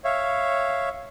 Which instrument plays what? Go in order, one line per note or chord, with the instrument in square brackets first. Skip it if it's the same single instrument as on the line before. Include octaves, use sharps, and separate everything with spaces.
[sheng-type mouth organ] C#5 E5 F5